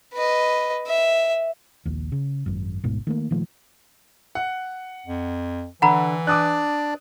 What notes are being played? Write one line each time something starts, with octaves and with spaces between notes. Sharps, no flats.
B4 D#5
E5
A#1 D#2
C#3
G#1 F#2
D#1 G#1 G#2 B2
D#3 A3 A#3
A#2 D#3 F3 A3
F#5
F2
D3 E3 F#5 A#5 B5
D4 D5 D6 D#6 F#6